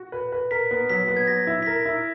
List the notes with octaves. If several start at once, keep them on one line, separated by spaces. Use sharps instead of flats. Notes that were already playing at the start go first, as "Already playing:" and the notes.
Already playing: F#4
B4
B4
A#4 B6
B3
F#3 B6
B3
G#6
F#3 A#6
E4
B6
A#4 A#6
E4